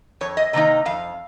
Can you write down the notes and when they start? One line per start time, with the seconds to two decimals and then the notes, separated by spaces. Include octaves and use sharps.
0.21 F2 C#5
0.37 D#5
0.53 C3 D#3 A#3 D#4 D#5
0.86 F2 F5